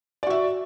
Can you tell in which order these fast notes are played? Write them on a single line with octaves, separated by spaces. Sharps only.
D5 F#4 E5